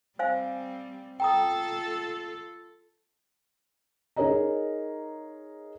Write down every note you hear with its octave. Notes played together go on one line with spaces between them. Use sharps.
G3 C4 C5 F5 G#5
F4 A4 G5 A#5 D#6
D#4 G#4 A#4 C#5 D#5 A#5